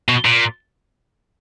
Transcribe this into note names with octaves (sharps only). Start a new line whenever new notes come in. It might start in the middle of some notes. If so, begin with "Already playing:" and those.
B2
A#2